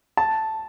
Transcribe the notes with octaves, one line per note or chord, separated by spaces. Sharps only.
A5